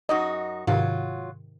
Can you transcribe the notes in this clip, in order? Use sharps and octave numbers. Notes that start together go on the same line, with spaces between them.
F#2 D#4 F#4 D#5
G#2 C3 D#3 F#3 F4